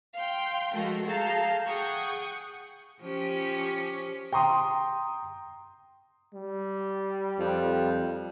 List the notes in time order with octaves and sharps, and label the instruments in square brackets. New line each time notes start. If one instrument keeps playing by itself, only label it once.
[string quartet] F5 G5 C6
F3 G#3 A3 F#4 A4 A#4
G#4 A4 F5 A5 A#5 G6
G#4 F#5 G5 C#6 D#6
[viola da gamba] F3 C#4 G4
[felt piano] G5 A#5 C6 D#6
[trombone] G3
[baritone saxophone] F2